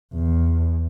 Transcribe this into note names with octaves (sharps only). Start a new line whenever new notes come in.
E2